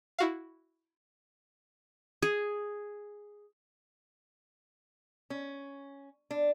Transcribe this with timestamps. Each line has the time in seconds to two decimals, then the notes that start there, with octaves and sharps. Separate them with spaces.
0.19 E4 F#4 F5
2.22 G#4
5.30 C#4
6.31 D4